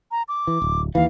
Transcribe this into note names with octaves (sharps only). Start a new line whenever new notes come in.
A#5
D6
E3
D1
D#2 E3 F5